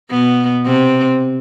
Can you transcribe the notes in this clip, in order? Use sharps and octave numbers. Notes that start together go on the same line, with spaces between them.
B2 B3
C3 C4